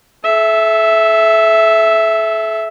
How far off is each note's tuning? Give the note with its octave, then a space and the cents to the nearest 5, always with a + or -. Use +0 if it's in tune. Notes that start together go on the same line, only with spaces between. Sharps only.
A4 -35 E5 +0